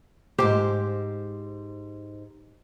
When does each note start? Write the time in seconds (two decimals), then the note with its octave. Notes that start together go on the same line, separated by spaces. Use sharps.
0.39 E2 G#2 G4 C5